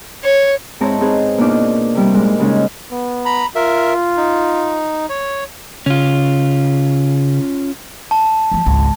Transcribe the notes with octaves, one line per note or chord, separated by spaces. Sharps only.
C#5
G#2 C4 E4 C#5 A5 A#5
C4 D#4 G#4 B4
B2 A#3 D4 D#4 F4 D5
C3 G3 E4
A#2 G#3
C#3 G#3 C#4 D#4
B3
A#5 B5
F4 A#4 E5
D#4
C#5
C#3 C#4 F4
A5
F3 F#3
G#1 C#2